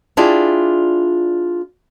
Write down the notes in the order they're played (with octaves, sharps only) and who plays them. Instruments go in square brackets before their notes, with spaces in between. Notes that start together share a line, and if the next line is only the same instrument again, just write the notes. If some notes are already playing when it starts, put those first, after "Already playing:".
[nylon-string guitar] D4 E4 F4 G4 G#4 D5